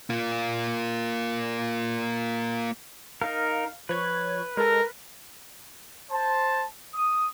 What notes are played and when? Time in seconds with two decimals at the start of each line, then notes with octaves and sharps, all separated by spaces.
0.10 A#3 F4
3.21 D#4 A#4 F5
3.89 F3 B4 C#5 G#6
4.57 G#3 A4 A#4
6.11 C5 A5
6.93 D#6